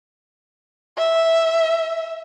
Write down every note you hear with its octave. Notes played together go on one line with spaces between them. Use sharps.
E5